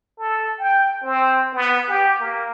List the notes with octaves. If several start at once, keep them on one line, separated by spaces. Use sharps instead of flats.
A4
G5
C4
B3
G4
A#3